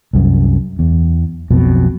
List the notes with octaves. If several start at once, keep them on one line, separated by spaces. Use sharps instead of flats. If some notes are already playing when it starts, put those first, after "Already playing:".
C2 F#2
E2
B1 F2 B2